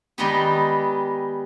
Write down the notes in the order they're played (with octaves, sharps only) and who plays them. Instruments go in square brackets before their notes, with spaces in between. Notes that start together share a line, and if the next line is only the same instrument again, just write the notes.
[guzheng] D#3 G3 G#3 B3 D#4 G4